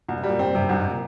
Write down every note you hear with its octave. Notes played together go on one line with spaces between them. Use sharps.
C2 A#2
C3
G3
A#2
G#2 C4
G2 C3
C2 G2
G#2
A#2